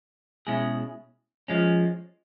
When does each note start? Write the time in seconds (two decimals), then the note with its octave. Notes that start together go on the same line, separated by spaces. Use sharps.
0.47 B2 G#3 C#4 E4 G#4
1.48 F3 G#3 C#4